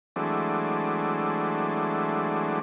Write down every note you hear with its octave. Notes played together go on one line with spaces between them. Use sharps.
E3 F#3 G#3 A3 C4 D4